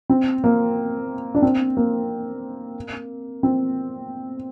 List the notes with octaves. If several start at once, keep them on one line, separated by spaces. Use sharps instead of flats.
C4
A#3
D4
C4
A#3
C4